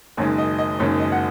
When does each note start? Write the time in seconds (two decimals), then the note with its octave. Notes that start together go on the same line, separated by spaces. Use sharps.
0.17 F#1 F#2 D#3 G#3 C#5
0.38 D#5
0.59 D#5
0.79 F#1 F#2 D#3 G#3 C#5
1.00 D#5
1.12 F#5